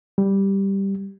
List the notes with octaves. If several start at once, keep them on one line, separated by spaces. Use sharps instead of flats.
G3